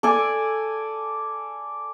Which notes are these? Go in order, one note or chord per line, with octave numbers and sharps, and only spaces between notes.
A4 D5 G#5